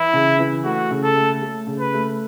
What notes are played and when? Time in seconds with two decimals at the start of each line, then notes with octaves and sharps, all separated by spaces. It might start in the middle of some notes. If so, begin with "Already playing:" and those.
Already playing: E3 E4
0.13 C#3
0.39 E3
0.64 A3 F#4
0.91 C#3
1.03 A4
1.16 A3
1.42 A3
1.67 C#3
1.79 B4
1.94 A3